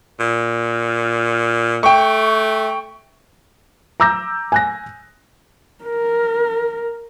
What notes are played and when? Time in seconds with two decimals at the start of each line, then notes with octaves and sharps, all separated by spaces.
0.20 A#2
1.83 A3 G5 C#6
4.00 A#5 D6 E6 G6 A#6
4.52 G#5 F#6 A#6
5.84 A#4